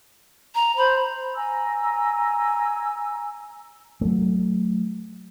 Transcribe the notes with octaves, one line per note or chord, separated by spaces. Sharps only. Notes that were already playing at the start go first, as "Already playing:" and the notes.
A#5
C5 B5
G#5 A#5 E6
F#3 A3